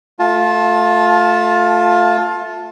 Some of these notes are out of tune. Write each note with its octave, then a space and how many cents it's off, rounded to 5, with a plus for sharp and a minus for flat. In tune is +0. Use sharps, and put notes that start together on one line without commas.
A3 +0 F4 +25 A5 -10